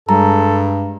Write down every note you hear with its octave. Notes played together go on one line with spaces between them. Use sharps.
G2 G3 G#3 G#4 A4 A#5